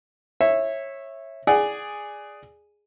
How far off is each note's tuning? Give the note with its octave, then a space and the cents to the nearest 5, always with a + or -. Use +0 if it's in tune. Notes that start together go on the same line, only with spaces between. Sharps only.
C#5 -20 E5 +0
G#4 +0 D5 +0 F#5 +30